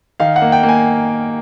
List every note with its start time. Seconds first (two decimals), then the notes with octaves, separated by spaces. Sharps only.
0.20 D#3 F5
0.36 F#5
0.42 A#3
0.52 G5
0.63 A#3
0.69 G#5